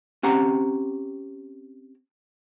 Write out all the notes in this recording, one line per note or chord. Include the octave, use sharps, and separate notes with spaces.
C4 C#4 G4 F#5 A#5